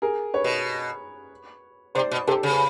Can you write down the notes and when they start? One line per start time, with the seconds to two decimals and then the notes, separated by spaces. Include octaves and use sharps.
0.02 G#4 A#4
0.34 B4 C#5
0.44 B2
1.95 C3 C5 D5
2.11 B2
2.27 C3 G4 A4
2.43 C#3
2.50 B4